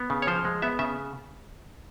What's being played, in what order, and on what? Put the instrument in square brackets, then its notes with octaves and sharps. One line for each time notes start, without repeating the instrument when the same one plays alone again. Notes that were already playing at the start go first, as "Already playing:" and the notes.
Already playing: [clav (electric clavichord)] B3
C#3
C#5
F3 C5
G#3
B3 E5
C#3 E5